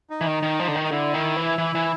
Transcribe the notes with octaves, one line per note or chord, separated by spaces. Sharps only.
D#4
E3
D#3
D#3
F3
D3
D#3
D#4
D3 E4
D#3
E3
E3
E3